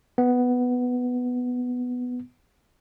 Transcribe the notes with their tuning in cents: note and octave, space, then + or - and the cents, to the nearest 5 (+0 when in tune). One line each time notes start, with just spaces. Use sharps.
B3 +5